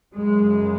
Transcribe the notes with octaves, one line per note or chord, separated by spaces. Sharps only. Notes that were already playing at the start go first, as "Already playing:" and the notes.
F#2 C#3 G#3